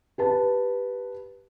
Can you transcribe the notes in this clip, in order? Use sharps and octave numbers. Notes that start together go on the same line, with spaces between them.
G4 B4 A5